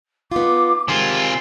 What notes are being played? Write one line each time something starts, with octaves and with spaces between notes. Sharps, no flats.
B3 D#4 F4 D6
C3 D#3 G#3 F4 G4 G#5